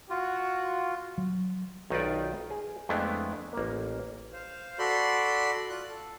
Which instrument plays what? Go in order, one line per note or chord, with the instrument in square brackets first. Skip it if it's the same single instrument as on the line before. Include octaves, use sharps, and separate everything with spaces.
[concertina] F4 [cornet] F#4
[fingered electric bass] F#3
[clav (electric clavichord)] B1 D#3 D#4 F4 B4 D5
G#4
F2 G#3 A3 B3 D4 E4
A1 A#3
[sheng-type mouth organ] C5 F5
F#4 A4 D5 B5 C6
F4 D5 F#6
A4